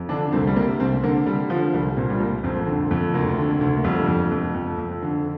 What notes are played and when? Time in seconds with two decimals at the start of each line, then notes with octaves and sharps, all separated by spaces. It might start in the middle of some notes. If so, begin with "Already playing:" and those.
Already playing: F2
0.09 D3 D4
0.32 C2 C4
0.47 G3
0.56 C3 A#3
0.80 C2 C4
1.04 D3 A#3
1.26 D3 G3
1.50 D3 F3
1.74 C2 G3
1.97 A#2 C4
2.10 G3
2.20 C2 A#3
2.43 F2 C4
2.67 D3
2.91 F2
3.14 D2 A#3
3.38 D3
3.61 D2
3.77 A#3
3.84 F2 G3
4.08 F2
4.31 F2
4.54 F2
4.78 F2
5.02 D3